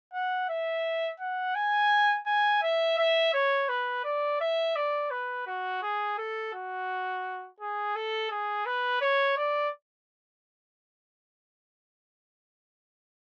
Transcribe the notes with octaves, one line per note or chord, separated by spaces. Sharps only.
F#5
E5
F#5
G#5
G#5
E5
E5
C#5
B4
D5
E5
D5
B4
F#4
G#4
A4
F#4
G#4
A4
G#4
B4
C#5
D5